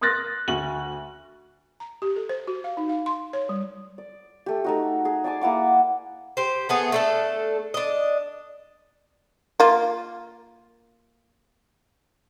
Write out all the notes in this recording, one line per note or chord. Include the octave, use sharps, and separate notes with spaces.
C6 D#6 F6 F#6 A6 A#6
D2 F#4 F#7
A#5
G4
A4
C5
F#4
F5
D#4
F5
C6
C#5
G3
D5
A3 G4
A3 D#4 F#4
G#4
D5 G#5 A5 D6
A#3 E4 F#5 D6
G4 C5
A3 B3 G#4
A3 D4 A4
D4 D#5
A#3 F4